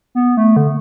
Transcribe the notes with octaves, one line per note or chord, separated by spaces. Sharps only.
B3
A3
D3